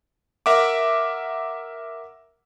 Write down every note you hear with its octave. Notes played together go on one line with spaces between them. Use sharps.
A#4 E5 F#5 D6